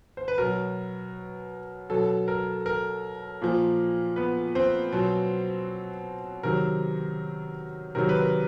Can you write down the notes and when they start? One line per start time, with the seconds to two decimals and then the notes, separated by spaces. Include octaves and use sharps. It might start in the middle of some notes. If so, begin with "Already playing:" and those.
0.17 C5
0.28 B4
0.38 B2 F#3 A#4
1.90 B2 F#3 A4
2.28 A#4
2.66 A#4
3.42 A#2 F3
4.16 B3 B4
4.55 C4 C5
4.92 B2 F#3
6.43 C3 D#3 F#3 A#4
7.95 C3 D#3 F#3 A#4
8.09 B4
8.21 A#4